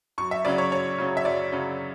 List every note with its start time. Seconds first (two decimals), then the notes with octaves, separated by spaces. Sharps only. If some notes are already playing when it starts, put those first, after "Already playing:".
0.18 F#2 C#6
0.31 E5
0.45 C#3 F#3 C#4 D5
0.58 C#5
0.72 F#2 C#5
0.98 C#3 F#3 C#4
1.17 E5
1.25 F#2 D5
1.52 C#3 F#3 C#4